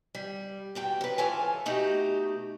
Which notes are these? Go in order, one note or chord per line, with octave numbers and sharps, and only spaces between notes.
G3
E2 B2 G5
F#2 B4
G#2 E3 F4 A4 C#5 G#5
B2 A3 D#4 F#4 G4